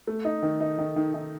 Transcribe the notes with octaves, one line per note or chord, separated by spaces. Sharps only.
A3
D#4
D#3
D#4
D#3
D#3
D#3